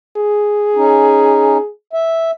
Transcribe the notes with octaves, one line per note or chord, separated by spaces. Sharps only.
G#4
C#4 D#4
E5